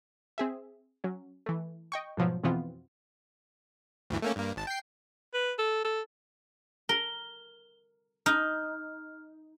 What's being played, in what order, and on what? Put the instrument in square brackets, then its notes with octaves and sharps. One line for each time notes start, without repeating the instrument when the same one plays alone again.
[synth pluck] C4 G#4 E5
F#3 C#4
E3 A3
D#5 G5 C#6
G#2 B2 F3 F#3
F2 B2 E3 B3 C4 F4
[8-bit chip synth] D2 G2 E3
A3 A#3 C#4
G2 A#3
G#1 A5
G5 C7
[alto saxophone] B4
A4
A4
[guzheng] A#4 [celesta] G7
[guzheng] D#4 [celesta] F6